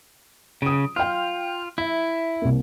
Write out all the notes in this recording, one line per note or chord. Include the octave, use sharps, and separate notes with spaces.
C#3 D#6 D7
F4 G5 F6
E4 E5
C2 A#3